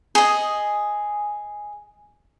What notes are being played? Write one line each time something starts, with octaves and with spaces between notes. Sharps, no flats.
G#4 D#5